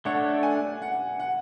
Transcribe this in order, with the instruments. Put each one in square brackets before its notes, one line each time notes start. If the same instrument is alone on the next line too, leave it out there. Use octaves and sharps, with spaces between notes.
[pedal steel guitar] A3 D4 A4 C#5 [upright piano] F#5
[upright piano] G#5
F#5
F#5